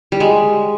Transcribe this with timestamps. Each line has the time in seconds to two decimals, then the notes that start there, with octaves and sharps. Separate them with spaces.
0.12 G3
0.20 G#3